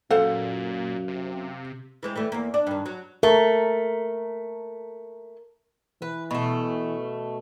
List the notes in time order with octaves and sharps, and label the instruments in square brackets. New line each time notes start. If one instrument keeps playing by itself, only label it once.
[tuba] F#2 [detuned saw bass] A#2 [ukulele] A4 C5 F#5 [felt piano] F5
[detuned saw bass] C3
[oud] E3 G#3 C4
E3 G3 A3
E2 A#3
D4
G2 D#3
F#3
[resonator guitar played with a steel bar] A3 [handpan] A#4
[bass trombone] E3 [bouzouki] B4
[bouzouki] B2 A3